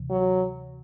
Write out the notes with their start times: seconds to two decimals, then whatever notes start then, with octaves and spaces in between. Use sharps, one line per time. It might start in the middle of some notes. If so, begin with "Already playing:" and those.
Already playing: D2 C3 E3
0.10 F#3